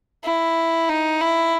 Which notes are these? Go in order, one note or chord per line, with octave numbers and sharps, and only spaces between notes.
E4
D#4
E4